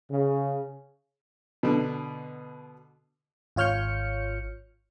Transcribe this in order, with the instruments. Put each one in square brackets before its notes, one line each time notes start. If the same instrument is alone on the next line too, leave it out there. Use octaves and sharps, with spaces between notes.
[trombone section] C#3
[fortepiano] B2 D3
[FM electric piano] G#1 F4 C#5 F6 G6 C#7